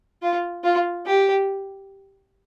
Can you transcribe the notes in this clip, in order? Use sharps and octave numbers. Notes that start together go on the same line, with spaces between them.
F4
F4
G4